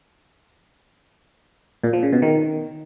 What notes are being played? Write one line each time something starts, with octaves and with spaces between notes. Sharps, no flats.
A#2
F3
C#3
B2
D#3